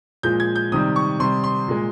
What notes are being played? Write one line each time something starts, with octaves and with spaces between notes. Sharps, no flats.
A#2 F3 G#3 G6
G#6
G6
C3 D#3 G3 D#6
C#6
C3 G3 C6
C6
A#2 G#3